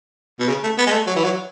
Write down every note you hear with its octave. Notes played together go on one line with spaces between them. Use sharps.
B2
C#3
A3
B3
G#3
A3
F#3
E3
F#3